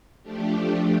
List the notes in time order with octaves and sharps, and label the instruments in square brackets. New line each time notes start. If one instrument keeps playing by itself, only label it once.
[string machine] F3 A3 D4 G4